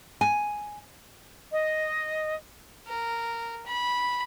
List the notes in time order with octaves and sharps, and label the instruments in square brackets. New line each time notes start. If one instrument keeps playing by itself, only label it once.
[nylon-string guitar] G#5
[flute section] D#5
[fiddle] A#4
B5